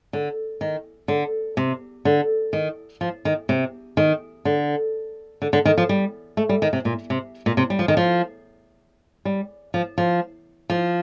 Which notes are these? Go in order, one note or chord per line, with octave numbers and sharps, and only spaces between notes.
D3
D#3
D3
C3
D3
D#3
F3
D#3
C3
D#3
D3
D3
D3
D#3
F3
G3
A3
G3
D#3
C3
A#2
C3
A#2
C3
G3
F3
D#3
F3
G3
F3
F3
F3